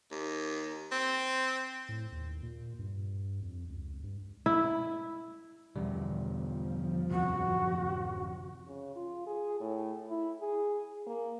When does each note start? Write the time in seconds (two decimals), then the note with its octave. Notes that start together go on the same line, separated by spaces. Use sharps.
0.11 D#2
0.92 C4
1.89 A2
2.12 D#2
2.43 A#2
2.79 G2
3.42 F2
3.69 C#2
4.03 G2
4.46 E4
5.76 E2 B2 D3 F3 G3
7.10 D1 F#2 C3 F#4
8.67 C#3
8.96 F4
9.27 G#4
9.60 A2
10.09 E4
10.41 G#4
11.07 A#3